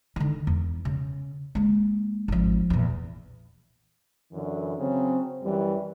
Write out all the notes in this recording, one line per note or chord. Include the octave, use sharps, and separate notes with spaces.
D3 D#3
E2
C#3
G#3 A#3
G#1 F3
E2 A#2
F#2 D3 E3
C#3 F#3 C4
F#2 E3 G3